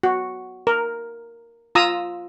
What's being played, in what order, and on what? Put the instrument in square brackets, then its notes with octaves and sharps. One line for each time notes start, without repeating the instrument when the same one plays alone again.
[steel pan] F#4
A#4
F4 A#5 D#6 E6